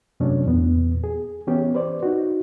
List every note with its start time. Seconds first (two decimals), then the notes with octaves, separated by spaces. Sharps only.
0.20 F#2 C3 F#3 A3 C#4 D4
0.46 E2 A#2 B3
1.04 G#4
1.47 E3 B3 C#4 G4
1.74 B4 C5 D5
2.03 D#4 F#4